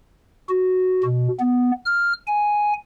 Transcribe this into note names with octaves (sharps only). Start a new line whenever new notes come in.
F#4
B2
B3
F6
G#5